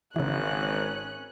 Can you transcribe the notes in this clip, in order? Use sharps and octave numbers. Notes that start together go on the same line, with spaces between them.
G#1 C#3 E3 C#4 F#6